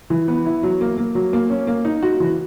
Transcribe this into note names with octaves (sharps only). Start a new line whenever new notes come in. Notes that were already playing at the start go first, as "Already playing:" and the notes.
E3
B3
E4
F#3
A#3
A#3
F#3
A#3
C#4
A#3
D#4
F#4
E3